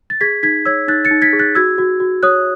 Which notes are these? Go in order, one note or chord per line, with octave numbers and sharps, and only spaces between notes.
A6
G#4 G#6 B6
D#4 G#6 B6
C#5 E6 G#6
D#4 F#6 A6
A6 C#7
D#4
G#6 B6
G#4
F#6 A6
F#4 E6 G#6
F#4
F#4
C#5 D#6 F#6